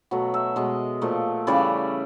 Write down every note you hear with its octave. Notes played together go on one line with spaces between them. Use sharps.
B2 F#3 A3
E5
B2 G#3 D#5
A#2 F3 A3
C#3 E3 G3 D5